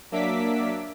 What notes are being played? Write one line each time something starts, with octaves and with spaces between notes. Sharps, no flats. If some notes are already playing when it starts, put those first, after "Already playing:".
F#3 A#3 D4 E5 D6 B6